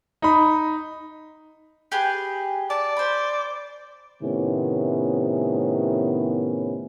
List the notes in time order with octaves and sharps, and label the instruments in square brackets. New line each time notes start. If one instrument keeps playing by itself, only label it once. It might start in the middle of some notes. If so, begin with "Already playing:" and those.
[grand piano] D#4 B5
[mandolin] G4 G#4 B4
[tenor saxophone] D5 [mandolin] A5
[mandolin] C5 B5
[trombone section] A2 C3 D#3 B3 C#4 E4